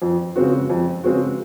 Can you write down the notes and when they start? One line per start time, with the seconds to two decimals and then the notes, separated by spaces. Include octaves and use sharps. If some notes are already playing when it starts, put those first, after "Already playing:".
0.02 F2
0.36 C#3 G#3 C4 F#4
0.70 F2
1.03 C#3 G#3 C4 F#4